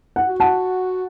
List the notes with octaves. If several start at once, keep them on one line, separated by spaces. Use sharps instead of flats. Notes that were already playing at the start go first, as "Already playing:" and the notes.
F#5
F#4
F#5 A5